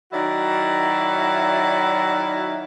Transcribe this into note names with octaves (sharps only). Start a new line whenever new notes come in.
D#3 F#3 E4 F#4 D5